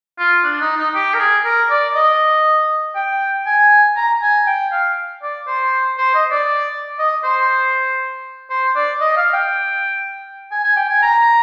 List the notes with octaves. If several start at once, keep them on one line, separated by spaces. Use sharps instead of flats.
F4
D4
D#4
D#4
G4
A#4
G#4
A#4
D5
D#5
G5
G#5
A#5
G#5
G5
F5
D5
C5
C5
D#5
D5
D#5
C5
C5
D5
D#5
F5
G5
G#5
G#5
G5
G#5
A#5